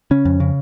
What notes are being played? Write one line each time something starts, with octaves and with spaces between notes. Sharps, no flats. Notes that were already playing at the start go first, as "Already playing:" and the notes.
C#3 C#4
F2
C#3